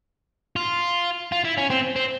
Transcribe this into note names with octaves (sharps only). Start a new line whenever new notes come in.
F4
F4
E4
C#4
C4
C4